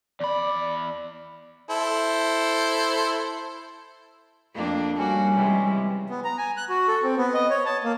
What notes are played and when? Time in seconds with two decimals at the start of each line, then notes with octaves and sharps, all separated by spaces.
0.20 E2 D5 B5
1.70 E4 A4 C5
4.55 F2 A#3 D4
4.98 G3 A#3 C#4 F#4
5.35 C3 E3 G#3
6.08 B3
6.24 A#5
6.38 G#5
6.57 F#6
6.70 F#4
6.88 A4
7.03 C4
7.18 B3
7.34 D#5
7.50 C#5
7.66 A5
7.84 A#3